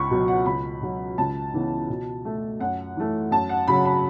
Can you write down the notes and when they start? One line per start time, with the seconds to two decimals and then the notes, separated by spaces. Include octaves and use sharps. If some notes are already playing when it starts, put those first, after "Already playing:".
Already playing: C#2 B5 C#6
0.11 B2 F#3 B3
0.28 F#5
0.46 C#2 B5
0.81 B2 F#3
1.18 C#2 A5
1.53 C#3 E3 B3
1.89 B2
2.25 A3
2.60 F#2 F#5
2.97 E3 A3
3.31 F#2 A5
3.49 F#5
3.68 C#3 F#3 B5
3.85 B5